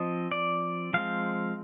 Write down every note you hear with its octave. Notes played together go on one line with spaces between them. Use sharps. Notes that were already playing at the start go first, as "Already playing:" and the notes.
Already playing: F3 C4 D#5
D5
F3 G#3 C4 F5